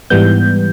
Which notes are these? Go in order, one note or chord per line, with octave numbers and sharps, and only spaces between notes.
G#2 E3 G3 B3 G6